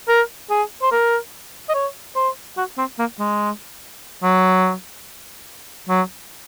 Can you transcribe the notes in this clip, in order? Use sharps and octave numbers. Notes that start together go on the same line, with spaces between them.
A#4
G#4
C5
A#4
D#5
C#5
C5
F#4
C4
A#3
G#3
F#3
F#3